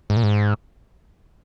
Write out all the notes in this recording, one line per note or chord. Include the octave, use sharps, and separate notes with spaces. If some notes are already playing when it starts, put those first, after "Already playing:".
G#2
A#2
G#2